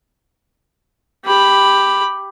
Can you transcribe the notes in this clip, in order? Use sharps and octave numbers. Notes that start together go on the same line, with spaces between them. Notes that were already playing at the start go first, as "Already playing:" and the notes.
G4 B5